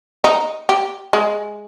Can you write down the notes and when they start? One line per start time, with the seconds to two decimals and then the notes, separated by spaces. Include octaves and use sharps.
0.24 D#4
0.69 G4
1.13 G#3